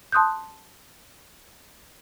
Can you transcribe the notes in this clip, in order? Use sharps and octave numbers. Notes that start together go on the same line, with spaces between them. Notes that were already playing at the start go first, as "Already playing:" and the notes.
A5 C6 D#6 F#6 G6